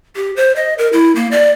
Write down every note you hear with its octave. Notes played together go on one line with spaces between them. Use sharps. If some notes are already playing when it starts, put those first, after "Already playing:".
G4
C5
D#5
A#4
E4
A#3
D5